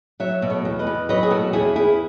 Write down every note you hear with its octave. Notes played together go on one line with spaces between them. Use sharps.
F#3 C#5 E5
B2
A4 C#5
E2
B4 D#5
E2
F#3 B4 D#5
G#4
B2 F#4 A4
E2 E4 G#4
E2 E4 G#4